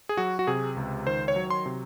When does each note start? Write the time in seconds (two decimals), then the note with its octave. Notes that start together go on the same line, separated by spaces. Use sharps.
0.09 G#4
0.17 F#3 F#4
0.39 F#4
0.47 C3 G#4
0.77 C#2
1.07 D#3 C5
1.28 C#5
1.36 F#3
1.50 C6
1.66 C3